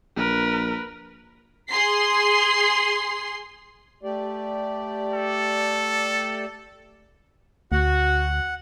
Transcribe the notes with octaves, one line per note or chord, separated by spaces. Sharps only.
A#1 A#4 B4
G#4 C6 C7
A3 G4 D5
A4
D2 F#4 F#5